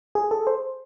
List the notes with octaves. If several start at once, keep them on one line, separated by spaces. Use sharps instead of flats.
G#4
A4
C5